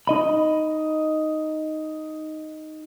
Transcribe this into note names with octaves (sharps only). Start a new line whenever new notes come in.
D#4 D#5 B5